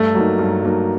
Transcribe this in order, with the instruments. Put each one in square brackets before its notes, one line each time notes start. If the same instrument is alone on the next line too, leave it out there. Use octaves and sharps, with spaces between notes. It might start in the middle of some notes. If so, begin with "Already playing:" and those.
Already playing: [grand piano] G2 [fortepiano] A3
[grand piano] F#3 A#3 D#4
G2
F#3 A#3 D#4